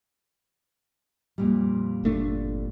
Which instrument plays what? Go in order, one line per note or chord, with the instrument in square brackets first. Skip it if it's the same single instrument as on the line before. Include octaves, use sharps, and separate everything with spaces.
[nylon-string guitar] F2 A#2 G3
[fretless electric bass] G1 A3 D4